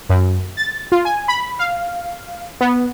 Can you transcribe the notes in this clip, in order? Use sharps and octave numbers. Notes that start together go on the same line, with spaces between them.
F#2
A6
F4
G#5
B5
F5
B3